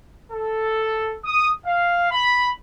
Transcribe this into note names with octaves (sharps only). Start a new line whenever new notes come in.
A4
D#6
F5
B5